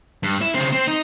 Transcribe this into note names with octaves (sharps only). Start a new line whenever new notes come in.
G2
E4
C#3 C4
C4
D#4